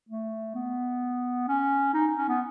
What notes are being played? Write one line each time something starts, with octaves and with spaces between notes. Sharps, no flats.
A3
B3
C#4
D#4
C#4
B3